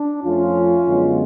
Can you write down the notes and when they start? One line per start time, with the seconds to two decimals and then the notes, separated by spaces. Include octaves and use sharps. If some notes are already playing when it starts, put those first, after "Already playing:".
Already playing: D4
0.24 F2 F3 A3 C#4 F4
0.87 F#2 D3 G#3 B3